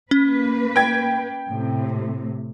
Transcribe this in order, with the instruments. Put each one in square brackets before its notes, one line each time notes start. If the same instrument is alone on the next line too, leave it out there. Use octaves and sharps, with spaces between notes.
[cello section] A#3 B4 [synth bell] C#4
[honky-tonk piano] G5 G#6
[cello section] A2 C3